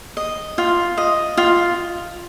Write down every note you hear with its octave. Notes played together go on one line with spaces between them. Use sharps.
D#5
F4
D#5
F4